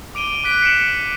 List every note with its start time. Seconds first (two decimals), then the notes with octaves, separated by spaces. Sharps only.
0.15 D6 D7 D#7 G7
0.44 D6 F#6 B6 D7
0.63 C#7 D7 E7 F#7